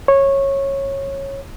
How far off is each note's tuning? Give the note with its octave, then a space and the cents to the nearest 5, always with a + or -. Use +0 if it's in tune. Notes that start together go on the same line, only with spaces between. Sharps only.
C#5 -15